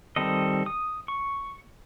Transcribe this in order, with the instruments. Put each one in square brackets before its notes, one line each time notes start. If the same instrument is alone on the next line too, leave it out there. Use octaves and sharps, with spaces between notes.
[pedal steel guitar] D#3 G3 C4 A4 D#5
D#6
C#6